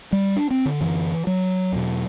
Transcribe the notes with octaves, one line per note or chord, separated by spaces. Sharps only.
G3
D4
C4
D3
F#2 D3 E3
F#3
E2 B2